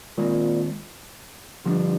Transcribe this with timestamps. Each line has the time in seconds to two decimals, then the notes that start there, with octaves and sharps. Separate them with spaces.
0.17 A#2 D#3 G#3 C4
1.65 G2 D3 F3 A#3 D4